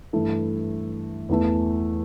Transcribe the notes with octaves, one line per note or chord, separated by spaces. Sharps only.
G2 E3 A3 E4 A4
E2 E3 A3